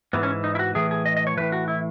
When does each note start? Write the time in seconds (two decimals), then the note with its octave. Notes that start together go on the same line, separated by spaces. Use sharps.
0.13 G#2 E3 B3
0.23 C#4
0.44 D#4
0.55 E4
0.59 F#4
0.75 A2 E3 G#4
0.91 G#4
1.06 D#5
1.17 D#5
1.27 C#5
1.37 A2 E3 B4
1.52 F#4
1.68 E4